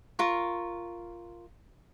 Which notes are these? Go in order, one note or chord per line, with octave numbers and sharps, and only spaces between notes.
F4 A#4 C#6